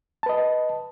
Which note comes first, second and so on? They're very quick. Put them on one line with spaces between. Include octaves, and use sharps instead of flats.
A5 B4 D#5